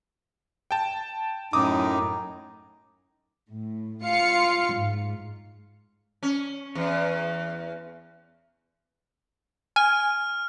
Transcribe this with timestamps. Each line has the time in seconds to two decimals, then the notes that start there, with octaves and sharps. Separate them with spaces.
0.71 G5 A5
1.53 F#2 A2 D#4 D6 D#6
3.49 A2
4.04 F4 F5 C#7
4.74 G#2
6.23 C#4
6.75 E2
9.76 G#5 F6